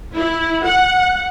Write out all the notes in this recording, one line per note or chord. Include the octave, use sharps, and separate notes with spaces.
E4
F#5